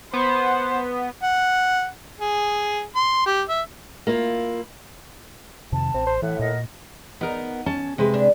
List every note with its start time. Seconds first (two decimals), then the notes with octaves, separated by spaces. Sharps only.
0.14 B3 C5
1.23 F#5
2.21 G#4
2.95 C6
3.26 G4
3.49 E5
4.07 A#3 E4 F4
5.72 F2 C3 D#3 A5
5.94 A1 C4
6.07 C5
6.22 A2 E3 E5 F#5 F#6
6.39 A#2 A#4 D#5 F#5
7.21 B3 D#4 A#4
7.66 C#4 A5
7.98 C3 G#3 B4
8.14 D4